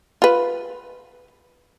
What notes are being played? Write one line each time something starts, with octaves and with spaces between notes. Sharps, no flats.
F4 B4